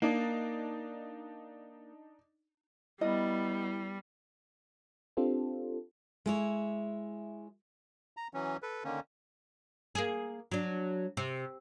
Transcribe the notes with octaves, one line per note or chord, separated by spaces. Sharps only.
A#3 D4 D#4
G3 B3 E4 D#5
C4 D4 F4 G4 A4 C5
G#3 E4 C#5
A#5
E3 F#3 C#4
A4 B4
D3 D#3 A#3 C#4
A#3 G#4
F#3 D4
C3